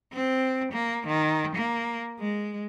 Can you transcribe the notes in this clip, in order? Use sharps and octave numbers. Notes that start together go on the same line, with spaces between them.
C4
A#3
D#3
A#3
G#3